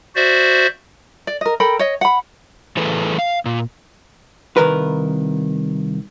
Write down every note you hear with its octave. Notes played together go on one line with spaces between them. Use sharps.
F#4 C5 D5 E5
D5
A#4 D#5
A4 A#4 G5 B5
C#5 D#5
F#5 B5
A2 E3 G#4 A4 B4
F5
A#2
C2 D#3 A#4 B4